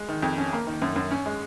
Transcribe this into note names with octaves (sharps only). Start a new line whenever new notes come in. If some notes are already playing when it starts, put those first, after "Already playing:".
Already playing: G#3
D#3
F2
C#4
A#3
D#3
F#2
F#2
C#4
G#3